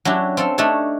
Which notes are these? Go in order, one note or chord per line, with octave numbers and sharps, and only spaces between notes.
F#3 C#4 D4 E4 G4
C4 A4 F5
A3 D4 D#4 A4 C#5